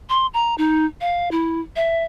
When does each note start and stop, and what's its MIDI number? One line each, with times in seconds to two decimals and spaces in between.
0.09 0.27 84
0.34 0.55 82
0.58 0.86 63
1.01 1.29 77
1.31 1.60 64
1.76 2.04 76